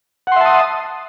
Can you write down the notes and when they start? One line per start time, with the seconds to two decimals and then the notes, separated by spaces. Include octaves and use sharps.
0.27 F#5
0.32 C6
0.36 E5
0.41 A5
0.45 D#6